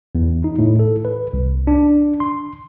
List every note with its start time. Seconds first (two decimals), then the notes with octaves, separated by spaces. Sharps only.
0.15 E2
0.44 D#4
0.59 A2
0.79 A4
1.05 B4
1.33 C2
1.67 D4
2.20 C6